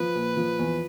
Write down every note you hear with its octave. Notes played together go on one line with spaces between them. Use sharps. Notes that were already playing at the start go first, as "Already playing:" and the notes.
Already playing: F3 B4
A#2
F3
E2